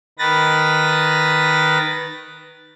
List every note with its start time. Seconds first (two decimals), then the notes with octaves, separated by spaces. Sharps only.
0.19 D#3 B4 A6 A#6